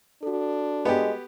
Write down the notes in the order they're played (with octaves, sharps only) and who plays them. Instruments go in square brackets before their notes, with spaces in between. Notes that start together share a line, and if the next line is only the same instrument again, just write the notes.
[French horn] D4 [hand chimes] F#4 A4
[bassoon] G#3 [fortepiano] B3 G4